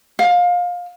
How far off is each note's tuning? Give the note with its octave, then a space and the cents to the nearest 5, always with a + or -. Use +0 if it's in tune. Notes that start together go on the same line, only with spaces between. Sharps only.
F5 +25